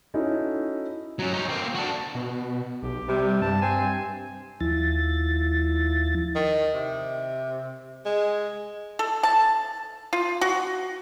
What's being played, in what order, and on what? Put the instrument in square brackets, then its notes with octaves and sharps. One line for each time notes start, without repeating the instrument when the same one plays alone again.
[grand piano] C#4 D#4 E4 F#4 A4
[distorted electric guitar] F#3 C#4
D#4 C#5
A#3 C4
D4 F#4
[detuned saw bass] B2
[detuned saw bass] B1 [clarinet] G4
[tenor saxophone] C3 [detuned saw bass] G3
[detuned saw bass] G2 [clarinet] A5
[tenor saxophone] C4 [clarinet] G#5
[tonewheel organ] D#2 F3 E4 A6
[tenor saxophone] D#3
C3
G#3
[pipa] A4
A5
F4
F#4